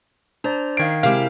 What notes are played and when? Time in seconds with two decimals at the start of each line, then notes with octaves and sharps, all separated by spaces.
0.44 D4 C5 D5 A#5
0.77 D#3 F5 G#6 C7 D7
1.03 C3 G#3 E4 G4 A#4 F5